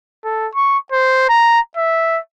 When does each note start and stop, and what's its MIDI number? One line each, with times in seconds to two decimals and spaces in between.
0.24 0.48 69
0.55 0.78 85
0.92 1.25 72
1.29 1.60 82
1.77 2.19 76